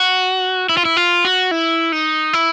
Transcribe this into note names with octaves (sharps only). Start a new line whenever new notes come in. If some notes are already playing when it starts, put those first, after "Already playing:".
Already playing: F#4
E4
F4
E4
F4
F#4
E4
D#4
E4